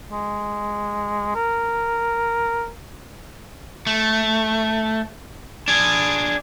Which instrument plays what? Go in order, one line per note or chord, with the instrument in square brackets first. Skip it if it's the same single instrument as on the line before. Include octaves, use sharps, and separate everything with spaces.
[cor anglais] G#3
A#4
[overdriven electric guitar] A3
D4 G#4